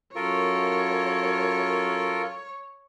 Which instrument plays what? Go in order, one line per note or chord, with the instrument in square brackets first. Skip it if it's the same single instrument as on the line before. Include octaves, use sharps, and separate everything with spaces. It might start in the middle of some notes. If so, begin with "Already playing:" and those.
[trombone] F#2 [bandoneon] F4 A4 A#4 [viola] C#5